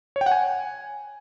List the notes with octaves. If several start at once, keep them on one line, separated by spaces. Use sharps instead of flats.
C#5
G5
F#5
G#5